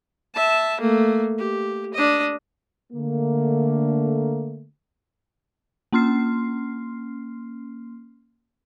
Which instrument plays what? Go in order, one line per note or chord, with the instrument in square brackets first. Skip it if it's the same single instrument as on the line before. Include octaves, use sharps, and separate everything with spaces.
[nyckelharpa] E5 A5
A3 A#3
G4
D4 D#5
[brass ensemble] D3 A3 A#3
[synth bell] A#3 C#4 C6 F6 C7